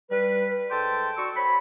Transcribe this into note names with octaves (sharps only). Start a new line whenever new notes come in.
G3 B4
G#2 A4 G5 A5 C6
D4 F#4 C#6 E6
C5 C#5 B5